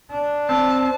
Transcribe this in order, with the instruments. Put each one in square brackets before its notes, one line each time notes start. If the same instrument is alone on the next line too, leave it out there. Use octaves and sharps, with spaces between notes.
[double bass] D4
[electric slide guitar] C4 [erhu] A5